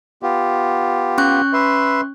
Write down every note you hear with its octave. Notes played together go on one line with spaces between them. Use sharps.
B3 F4 G4
C#4 C#6 F#6
B4 E5 C6